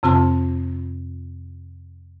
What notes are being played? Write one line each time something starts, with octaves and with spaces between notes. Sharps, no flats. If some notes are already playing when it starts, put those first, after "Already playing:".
F2 C3 C4 F4 A5